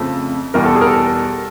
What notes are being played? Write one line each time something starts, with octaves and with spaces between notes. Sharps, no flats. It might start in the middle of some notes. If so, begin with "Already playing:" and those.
Already playing: F2 C#3 F3 A3
E2 B2 G3 A#4
A4
G#4
A#4
A4